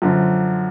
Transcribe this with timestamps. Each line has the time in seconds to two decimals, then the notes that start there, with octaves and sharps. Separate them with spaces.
0.02 F#2 D3 F3